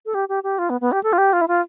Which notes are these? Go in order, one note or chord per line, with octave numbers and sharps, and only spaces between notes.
A4
G4
G4
G4
F4
B3
B3
G4
A4
F4
G4
F4
E4
F4